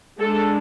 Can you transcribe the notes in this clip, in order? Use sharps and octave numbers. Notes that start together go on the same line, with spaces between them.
G#3 D4 A4